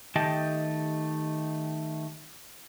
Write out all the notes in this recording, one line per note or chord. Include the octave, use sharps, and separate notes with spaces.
D#3 A3 G4 D#5 G5 A5